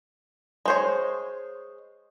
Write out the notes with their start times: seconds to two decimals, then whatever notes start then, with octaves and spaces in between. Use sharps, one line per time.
0.66 G#3 C5 C#5